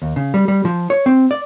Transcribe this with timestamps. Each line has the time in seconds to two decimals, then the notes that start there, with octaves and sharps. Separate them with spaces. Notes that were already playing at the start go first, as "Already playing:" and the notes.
0.02 D#2
0.16 C#3
0.34 G3
0.48 G3
0.65 F3
0.90 C#5
1.06 C4
1.31 D5